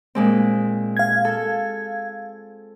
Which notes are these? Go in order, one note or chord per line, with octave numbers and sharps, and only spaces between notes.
A#2 G#3 C4
F5 G#6
A4